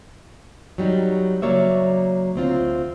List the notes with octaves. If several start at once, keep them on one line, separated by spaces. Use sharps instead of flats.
F#3 G3 D#4
C#3 F#3 A#3 C#5 D5 E5
D2 C4 F4